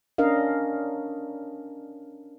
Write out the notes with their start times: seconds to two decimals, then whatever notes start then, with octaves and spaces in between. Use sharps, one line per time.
0.18 C#4 D4 A#4 D#5 F5